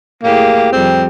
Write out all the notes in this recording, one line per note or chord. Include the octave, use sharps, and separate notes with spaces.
A2 A#3 G4 G#4
F2 G3 C4